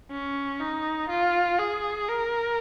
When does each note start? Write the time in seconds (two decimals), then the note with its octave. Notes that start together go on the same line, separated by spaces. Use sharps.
0.11 C#4
0.60 D#4
1.09 F4
1.59 G#4
2.08 A#4